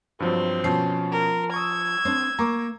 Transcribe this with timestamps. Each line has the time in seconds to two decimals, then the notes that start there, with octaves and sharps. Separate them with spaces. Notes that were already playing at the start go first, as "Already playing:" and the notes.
0.20 G2 F3 F#3 C4
0.64 B2 F3 C#4 C7
1.12 A#4
1.54 C#6 D#6 E6 G#6
2.05 C4 D4
2.39 A#3 A#5 C#6 D6